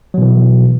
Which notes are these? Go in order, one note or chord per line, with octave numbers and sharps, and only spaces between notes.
B2 E3 F#3